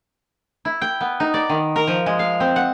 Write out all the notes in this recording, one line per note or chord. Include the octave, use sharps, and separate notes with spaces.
E4
G5
B3
D#4
D5
D#3
A#4
F3
G#3
F5
C4
F#5